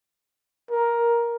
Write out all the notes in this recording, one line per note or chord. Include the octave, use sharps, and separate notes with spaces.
A#4